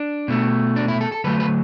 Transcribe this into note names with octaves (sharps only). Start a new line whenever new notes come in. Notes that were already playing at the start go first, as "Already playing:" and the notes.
Already playing: D4
B2 A3
D4
E4
A4
A4
D3 F#3 A3 B4
B4